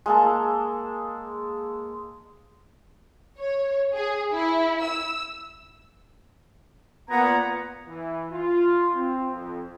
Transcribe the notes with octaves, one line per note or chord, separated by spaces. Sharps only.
G#3 A#3 A4
C#5
G#4
E4
E6
A#2 B3 F#5 A#5 G#6
E3
F4
C4
F2